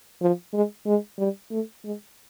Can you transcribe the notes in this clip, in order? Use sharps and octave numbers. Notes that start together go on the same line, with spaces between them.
F3
G#3
G#3
G3
A3
G#3